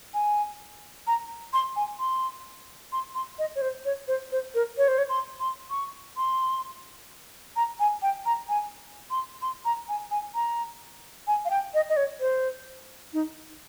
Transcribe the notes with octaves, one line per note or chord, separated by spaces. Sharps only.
G#5
A#5
C6
G#5
C6
C6
C6
D#5
C#5
C5
C#5
C5
C5
A#4
C#5
C5
C#5
C6
C6
C#6
C6
A#5
G#5
G5
A#5
G#5
C6
C6
A#5
G#5
G#5
A#5
G#5
F5
G5
D#5
D#5
C#5
C5
D#4